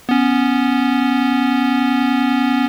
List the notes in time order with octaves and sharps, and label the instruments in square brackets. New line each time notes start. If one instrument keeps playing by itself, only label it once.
[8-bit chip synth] B3 C#4